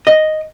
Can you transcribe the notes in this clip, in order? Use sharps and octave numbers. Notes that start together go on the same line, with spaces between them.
D#5